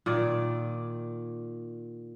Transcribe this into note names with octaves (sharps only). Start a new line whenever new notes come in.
A#2 D#3 D5